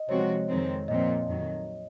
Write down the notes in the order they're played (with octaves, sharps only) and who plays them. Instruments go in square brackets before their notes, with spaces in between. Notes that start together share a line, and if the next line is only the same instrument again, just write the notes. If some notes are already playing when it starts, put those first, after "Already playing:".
Already playing: [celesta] D#5
[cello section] C3 F3 G#3 C4 F#4 [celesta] C#5
[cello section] F2 D#3 G#3 C4
[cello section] A#2 F3 C4 [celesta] D#5
[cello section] F2 D#3 F#3